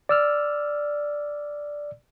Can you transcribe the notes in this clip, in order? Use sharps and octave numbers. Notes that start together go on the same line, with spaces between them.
D5 E6 F6